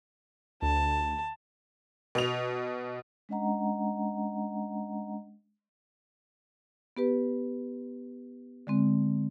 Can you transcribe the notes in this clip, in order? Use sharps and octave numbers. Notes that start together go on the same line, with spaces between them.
D2 A5
B2 F7
G#3 C#4 D4 D#5 F#5 A#5
B3 G4 B4
D3 G#3 C4